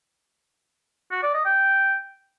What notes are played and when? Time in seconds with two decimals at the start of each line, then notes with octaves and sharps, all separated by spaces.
1.11 F#4
1.23 D5
1.34 D#5
1.45 G5